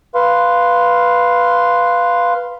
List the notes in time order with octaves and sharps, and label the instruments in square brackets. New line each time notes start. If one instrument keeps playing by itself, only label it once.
[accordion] B4 F5 C6